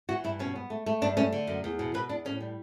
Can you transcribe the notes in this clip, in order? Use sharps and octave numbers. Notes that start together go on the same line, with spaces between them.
E3 F#4
G2 E4
B2 C#4
B3
A3
A3
G2 D4
A3 C#4
D3
F#2
E2
B2
B2 B4
E2 D4
A2 C#4
G3